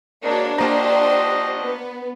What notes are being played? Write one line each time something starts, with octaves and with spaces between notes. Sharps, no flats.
G#2 A#3 D4 F#4 C#5
F3 A#3 F#4 G4 C5 D#5 A#5 C6
B3